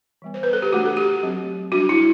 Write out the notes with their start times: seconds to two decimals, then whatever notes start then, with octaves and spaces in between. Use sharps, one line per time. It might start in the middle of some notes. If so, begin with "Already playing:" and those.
0.22 E3 G3 B3
0.34 C5
0.43 B4
0.53 A4
0.62 G4
0.72 E3 A3 D4 F#4
0.86 A4
0.97 G4
1.23 F#3 A3 C4
1.72 G3 D4 F#4
1.89 E4